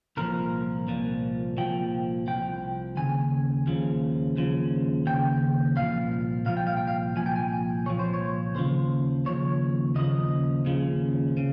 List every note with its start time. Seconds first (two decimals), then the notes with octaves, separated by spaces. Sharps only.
0.17 C2 A#2 F3 A#4
0.87 C2 A#2 F3
1.57 C2 A#2 F3 G5
2.27 C2 A#2 F3 G5
2.97 D#2 C#3 G#5
3.67 D#2 C#3 F3
4.36 D#2 C#3 F3
5.06 D#2 C#3 G5
5.76 C2 A#2 F3 F5
6.45 C2 A#2 F3 F5
6.57 G5
6.67 F5
6.77 G5
6.87 F5
7.16 C2 A#2 F3 G#5
7.26 G5
7.36 G#5
7.86 C2 A#2 F3 C#5
7.99 C5
8.14 C#5
8.55 D#2 C#3 F3 C5
9.25 D#2 C#3 F3 C#5
9.95 D#2 C#3 F3 D#5
10.65 D#2 C#3 F3
11.37 C#3